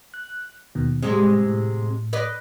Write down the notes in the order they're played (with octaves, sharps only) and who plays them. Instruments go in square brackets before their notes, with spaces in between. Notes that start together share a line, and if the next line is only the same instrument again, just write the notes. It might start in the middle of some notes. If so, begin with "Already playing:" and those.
[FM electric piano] F#6
D#2 B2 D#3
[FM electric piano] A2 G3 C4 [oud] C3 G#3
[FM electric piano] A2
[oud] B4 D5 D#5